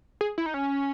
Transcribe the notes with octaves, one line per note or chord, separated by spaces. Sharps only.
G#4
E4
D#4
C#4